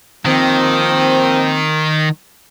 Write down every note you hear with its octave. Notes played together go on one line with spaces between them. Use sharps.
D#3 F3 A#3 C4